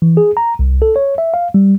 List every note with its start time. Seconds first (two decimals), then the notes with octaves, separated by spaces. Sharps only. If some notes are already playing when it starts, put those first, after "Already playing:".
0.02 E3
0.17 G#4
0.37 A#5
0.59 C2
0.82 A4
0.96 C#5
1.18 E5
1.34 F5
1.54 G3